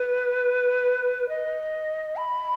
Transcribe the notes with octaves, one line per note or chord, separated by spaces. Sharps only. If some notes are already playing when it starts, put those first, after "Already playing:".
Already playing: B4
D#5
B5